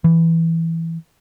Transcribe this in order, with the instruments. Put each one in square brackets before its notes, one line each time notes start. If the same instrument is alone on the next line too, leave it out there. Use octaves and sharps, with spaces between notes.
[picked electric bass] E3